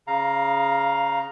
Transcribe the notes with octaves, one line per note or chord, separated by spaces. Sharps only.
C#3 F5 A#5